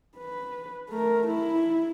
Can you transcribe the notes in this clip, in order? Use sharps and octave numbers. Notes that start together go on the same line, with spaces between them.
B4
A3 A#4
E4